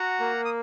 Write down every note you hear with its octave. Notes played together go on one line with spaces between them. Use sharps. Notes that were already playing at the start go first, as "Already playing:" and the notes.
Already playing: F#4 F#5 A#5
A#3
D#6